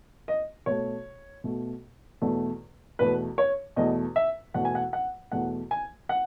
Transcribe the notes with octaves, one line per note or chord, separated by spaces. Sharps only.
D#5
B2 A3 C#5
B2 A3
E2 B2 A3
E2 B2 A3 B4
C#5
E2 B2 A3 D#5
E5
E2 B2 A3 F#5
G#5
F#5
F#5
E2 B2 A3 F#5
G#5
F#5